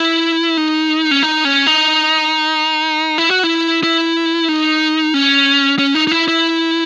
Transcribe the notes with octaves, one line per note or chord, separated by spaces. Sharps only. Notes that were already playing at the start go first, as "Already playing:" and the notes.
Already playing: E4
D#4
C#4
D#4
C#4
D#4
E4
F#4
E4
E4
D#4
C#4
C#4
D#4
D#4
E4
E4